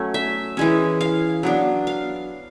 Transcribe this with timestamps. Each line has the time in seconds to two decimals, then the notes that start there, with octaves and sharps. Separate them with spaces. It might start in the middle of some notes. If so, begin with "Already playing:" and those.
Already playing: F#3 A3 C#4
0.14 E5
0.57 E3 G#3 C#4
1.01 F5
1.43 F#3 B3 D4
1.87 F5